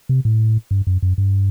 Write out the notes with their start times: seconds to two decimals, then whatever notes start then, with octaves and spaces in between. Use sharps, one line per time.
0.09 C3
0.25 A2
0.71 G2
0.87 F#2
1.03 F#2
1.18 G2